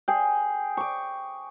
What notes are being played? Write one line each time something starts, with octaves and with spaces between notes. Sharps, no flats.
G#4 G5
C#6 D6